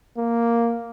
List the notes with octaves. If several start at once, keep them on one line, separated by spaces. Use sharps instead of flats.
A#3